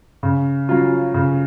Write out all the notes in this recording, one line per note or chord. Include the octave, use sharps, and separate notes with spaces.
C#3
F#3 C#4 F4
C#3